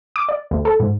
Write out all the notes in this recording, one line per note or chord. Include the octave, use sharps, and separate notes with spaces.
D6
D5
D2
A4
G#2